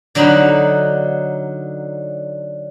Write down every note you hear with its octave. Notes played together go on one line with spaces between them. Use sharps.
D3 F#3 D#4 B5